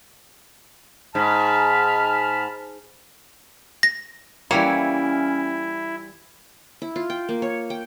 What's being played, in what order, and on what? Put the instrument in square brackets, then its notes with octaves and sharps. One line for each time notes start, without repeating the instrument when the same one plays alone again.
[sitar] G#2 [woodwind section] A5 B5 F6
[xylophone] A#6
[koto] E3 G3 C#5 [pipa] A#3 [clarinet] C#4 [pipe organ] E4
[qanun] E4
F4
G5
A#3
C#5
G5